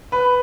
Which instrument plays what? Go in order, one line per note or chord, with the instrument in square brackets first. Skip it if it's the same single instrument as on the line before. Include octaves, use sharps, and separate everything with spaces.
[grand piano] B4